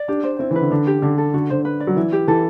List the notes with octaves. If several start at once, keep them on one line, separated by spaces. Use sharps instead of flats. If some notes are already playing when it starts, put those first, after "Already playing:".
Already playing: D5
D4 G4
C5
C4 E4
E3
B4
D3
D3 D4
G4
D3 D4
A4
D3 F#4
D3 C5
B4
D5
F#3
E3 E4
G4
E3 A4